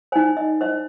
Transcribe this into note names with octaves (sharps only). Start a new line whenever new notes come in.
D#4 C5 G#5
D#5
D#4 C5 D#5